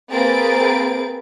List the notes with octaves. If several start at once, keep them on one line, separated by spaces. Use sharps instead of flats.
A#3 C4 G#4 B4 A6 D7